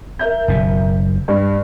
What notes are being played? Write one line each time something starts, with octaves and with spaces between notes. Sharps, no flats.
A#4 E5 G6
F#1 B2
G2